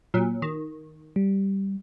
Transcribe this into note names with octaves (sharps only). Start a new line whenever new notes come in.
A#2 F#3
D#3
G3